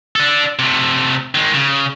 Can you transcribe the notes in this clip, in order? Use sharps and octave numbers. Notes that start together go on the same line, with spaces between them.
D4 A4
C3 A3
D#3 G#3
C#3